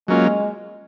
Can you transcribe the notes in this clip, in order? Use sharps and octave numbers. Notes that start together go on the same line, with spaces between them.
F#3 G#3 A#3 C#4 F4